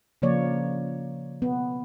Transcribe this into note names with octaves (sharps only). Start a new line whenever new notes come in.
C#3 F3 A#3 C#5 D5
B3